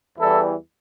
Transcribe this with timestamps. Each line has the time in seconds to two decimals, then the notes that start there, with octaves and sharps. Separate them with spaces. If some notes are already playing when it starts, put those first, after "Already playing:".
0.19 E2 E3 G3 E4 A4